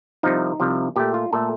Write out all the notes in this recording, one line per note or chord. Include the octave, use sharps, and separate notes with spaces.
C2 C3 F3 D#4
C2 C3 F3
A#2 A3 G4
F4
A#2 A3 A4